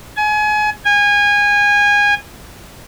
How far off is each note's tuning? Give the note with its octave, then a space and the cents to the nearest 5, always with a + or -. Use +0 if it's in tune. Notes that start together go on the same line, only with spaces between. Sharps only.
G#5 +30
G#5 -25